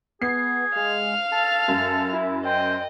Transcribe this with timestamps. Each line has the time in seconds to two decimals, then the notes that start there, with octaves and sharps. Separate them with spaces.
0.22 B3 G#4 C7
0.76 G#3 F5 F6
1.32 A4 A5
1.68 F#2
2.13 E4
2.45 C5 D#5 G5